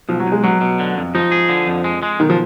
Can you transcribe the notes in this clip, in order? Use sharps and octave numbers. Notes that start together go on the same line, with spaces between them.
B1 F3
F#3
B1
G#3
B2 F#3
B2
D3
F2
F3 D#4
G#4
D3
F2
G#3
G#3
B1 D#3
F3